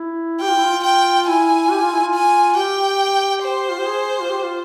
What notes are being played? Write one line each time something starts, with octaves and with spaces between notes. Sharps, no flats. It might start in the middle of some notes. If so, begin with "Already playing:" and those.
Already playing: E4
G4 G5
F4
E4
F4
G5
E4 G#5
G4
F4
E4
F4
G#5
G4 G5
C5
F4
G4
G#4
F4
G4
F4